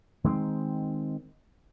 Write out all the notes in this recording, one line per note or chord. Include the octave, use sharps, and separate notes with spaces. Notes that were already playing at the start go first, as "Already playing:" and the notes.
D#3 G#3 A3 C4